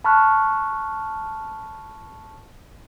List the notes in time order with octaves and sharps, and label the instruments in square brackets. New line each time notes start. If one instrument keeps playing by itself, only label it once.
[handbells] A5 B5 C#6 F6 F#6